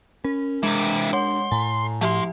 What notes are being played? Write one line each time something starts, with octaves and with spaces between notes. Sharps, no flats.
C#4 A#4
C3 E3 G#3 D4
C#5 F#5 C6
A2 G#5 A#5
F3 A3 G4 E5 C6